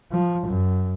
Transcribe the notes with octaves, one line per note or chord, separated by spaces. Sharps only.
F3
F#2